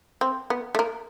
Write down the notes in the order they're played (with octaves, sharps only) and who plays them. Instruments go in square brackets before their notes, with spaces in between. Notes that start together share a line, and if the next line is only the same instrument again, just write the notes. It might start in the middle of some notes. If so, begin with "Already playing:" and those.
[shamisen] C4
B3
A3
A#3